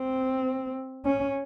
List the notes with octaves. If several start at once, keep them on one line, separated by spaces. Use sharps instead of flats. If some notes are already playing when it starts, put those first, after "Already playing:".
Already playing: C4
C#4